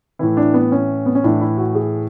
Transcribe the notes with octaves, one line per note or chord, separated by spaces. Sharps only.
A2 E3 E4
D4
B3
C#4
B3
C#4
A2 E3 D4
E4
F#4
G#4